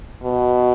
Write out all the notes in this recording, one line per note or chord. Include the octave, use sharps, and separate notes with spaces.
B2